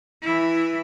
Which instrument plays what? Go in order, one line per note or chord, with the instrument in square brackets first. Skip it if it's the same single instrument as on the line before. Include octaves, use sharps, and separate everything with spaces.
[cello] E3 E4